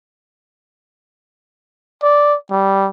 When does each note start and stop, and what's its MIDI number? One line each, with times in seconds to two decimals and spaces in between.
2.03 2.36 74
2.51 2.89 55